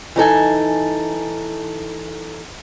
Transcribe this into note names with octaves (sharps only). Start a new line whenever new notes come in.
E3 D#4 A4 G#5